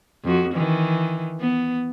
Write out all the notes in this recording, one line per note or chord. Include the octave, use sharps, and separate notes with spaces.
F2 F#4
D#3 E3
B3